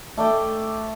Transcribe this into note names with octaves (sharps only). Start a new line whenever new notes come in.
A3 D5 G5